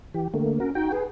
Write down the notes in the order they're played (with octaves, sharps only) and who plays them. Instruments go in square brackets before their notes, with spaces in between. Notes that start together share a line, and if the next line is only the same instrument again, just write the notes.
[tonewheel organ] E3 G4
D3 A3 A#3
[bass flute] C#4 [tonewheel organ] F#4 A#4
[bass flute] D#4 [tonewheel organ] F#4 G5
[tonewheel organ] G#4 [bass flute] B4